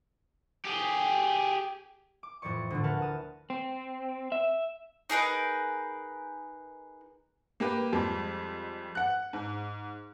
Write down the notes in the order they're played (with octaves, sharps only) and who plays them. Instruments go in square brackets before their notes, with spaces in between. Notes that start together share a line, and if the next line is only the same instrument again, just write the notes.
[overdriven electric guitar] G4 G#4
[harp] D6
F2 A2 E3 D5 C#6
D2 A2 D3
A#4 B4 F#5 A5 F6
A5 D#6 F6
[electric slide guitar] C4
E5
[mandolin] D#4 G#4 A#4 B4
[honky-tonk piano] A#3 G4 B4
F2 G3 G#3
F#5 F#6
G#2